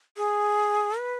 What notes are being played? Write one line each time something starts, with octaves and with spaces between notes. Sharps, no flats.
G#4
B4